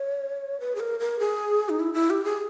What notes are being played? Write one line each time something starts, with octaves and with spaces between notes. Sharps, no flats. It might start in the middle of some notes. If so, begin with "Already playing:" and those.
Already playing: C#5
B4
G#4
A#4
A#4
G#4
D#4
E4
E4
G4
G#4